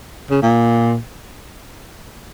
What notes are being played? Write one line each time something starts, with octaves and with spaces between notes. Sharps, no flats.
C#3
A#2